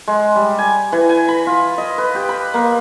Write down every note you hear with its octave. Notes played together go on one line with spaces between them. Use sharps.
G#3
G3
G#5
E3
G#5
B5
F4
D#5
B4
G4
B5
A#3